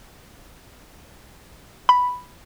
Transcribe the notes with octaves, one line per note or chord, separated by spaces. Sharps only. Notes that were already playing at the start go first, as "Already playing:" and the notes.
B5